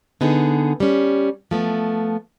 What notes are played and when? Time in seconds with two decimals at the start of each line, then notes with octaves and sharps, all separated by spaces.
0.21 D3 B3 D#4 G#4
0.80 G3 C#4
1.51 F3 A3 B3